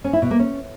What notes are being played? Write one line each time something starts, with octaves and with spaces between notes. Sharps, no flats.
C#4
E4
B2
A#3
C#4